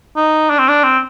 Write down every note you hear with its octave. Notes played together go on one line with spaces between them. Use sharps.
D#4
D4
C4
D4
C4